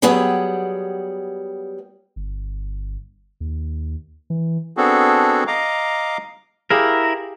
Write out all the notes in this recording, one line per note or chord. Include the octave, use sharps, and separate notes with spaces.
F#3 G3 B3 G#4 F#5 G5
G1
D#2
E3
B3 C4 D4 F#4 G#4 A4
D#5 F5 A#5 D6
E4 G4 G#4 A#4 F5